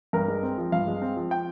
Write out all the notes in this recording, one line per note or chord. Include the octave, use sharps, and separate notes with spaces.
G2 A#4
G#3
C4
F3
G2 F5
G#3
C4
F3
G5